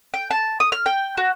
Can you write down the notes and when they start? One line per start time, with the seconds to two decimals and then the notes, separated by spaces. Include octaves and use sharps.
0.14 G5
0.31 A5
0.60 D#6
0.72 F6
0.86 G5
1.17 F#4